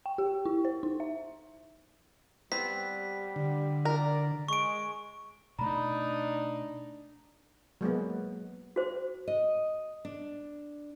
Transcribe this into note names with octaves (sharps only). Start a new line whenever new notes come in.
G5
G4
E4
C5
D#4
E5
G3 B3 C4 B6
D3
A#4 D5
G#3 C#6 D7
B2 A3 D4 D#4 A#5 B5
F#3 G#3 A#3 B3
F#4 C5
D#5
D4